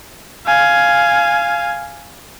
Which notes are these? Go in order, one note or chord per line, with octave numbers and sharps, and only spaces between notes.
F5 G#5